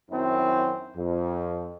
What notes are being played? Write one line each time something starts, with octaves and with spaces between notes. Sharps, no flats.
F#2 D#3 F#3 C4 E4
F2